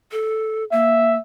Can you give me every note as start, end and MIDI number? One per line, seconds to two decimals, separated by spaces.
0.12 0.64 69
0.72 1.17 58
0.72 1.19 76